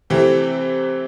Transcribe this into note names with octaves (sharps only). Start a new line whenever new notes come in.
C3 E3 A3 C4 G4